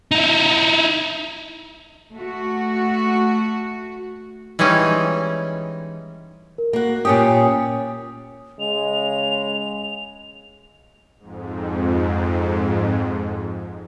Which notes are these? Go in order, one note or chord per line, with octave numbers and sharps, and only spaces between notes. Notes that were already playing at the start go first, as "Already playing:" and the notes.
D#4 E4
A3 F#4
E3 G3 G#3 C#4 D#4
A#4
A#3 F#4
A#2 C#4 G4 G#5 D#6
C#3 G#3 F7
F2 G#2